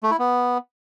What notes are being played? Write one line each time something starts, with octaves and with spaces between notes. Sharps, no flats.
A3
E4
B3